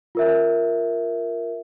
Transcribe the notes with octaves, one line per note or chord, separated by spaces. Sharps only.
F4 A#4 E5